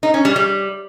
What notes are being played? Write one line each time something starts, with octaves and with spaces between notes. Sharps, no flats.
D#4
C#4
G3
G3